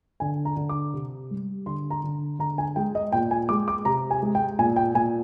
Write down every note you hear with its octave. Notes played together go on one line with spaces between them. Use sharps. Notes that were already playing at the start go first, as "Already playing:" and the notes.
D3 G#5
A#5
D3
D6
C3
G3
D3 C6
A#5
D3
D3 A#5
G#5
G#3 G5
D#5
A#2 G5
G#5
G#3 D6
D6
C3 A#5
G#5
G#3
G5
A#2 G#5
G5
A#2 G#5